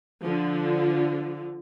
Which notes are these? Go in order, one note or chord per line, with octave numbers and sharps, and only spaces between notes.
D3 F3